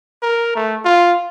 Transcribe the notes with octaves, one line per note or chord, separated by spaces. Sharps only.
A#4
A3
F4